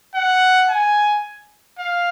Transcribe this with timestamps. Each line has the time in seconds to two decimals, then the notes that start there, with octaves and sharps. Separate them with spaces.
0.15 F#5
0.69 G#5
1.79 F5